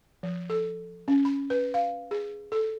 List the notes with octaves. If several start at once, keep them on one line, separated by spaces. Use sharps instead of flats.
F3
A4
C#4
B5
B4
F5
G#4
A4